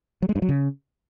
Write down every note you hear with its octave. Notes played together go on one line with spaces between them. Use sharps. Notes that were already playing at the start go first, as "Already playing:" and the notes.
F#3
G#3
G2
F#3
C#3